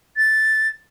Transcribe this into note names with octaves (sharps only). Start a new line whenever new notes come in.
A6